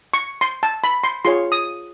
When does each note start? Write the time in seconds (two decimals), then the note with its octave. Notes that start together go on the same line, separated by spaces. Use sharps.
0.13 C#6
0.41 C6
0.63 A5
0.84 B5
1.04 C6
1.25 F4 G#4 C#5 C6
1.52 D#6